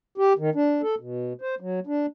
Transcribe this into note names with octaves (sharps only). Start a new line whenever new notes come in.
G4
D#3
D4
A4
B2
C5
F#3
D4